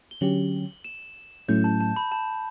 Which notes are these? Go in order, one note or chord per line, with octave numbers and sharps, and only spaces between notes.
G7
D3 F#3 C#4 G4 F#7
E7
A2 F#3 A3 C#4 E4 G6
A5
A5
B5
A5